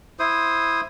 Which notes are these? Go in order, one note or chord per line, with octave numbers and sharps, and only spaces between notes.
E4 C5 D#6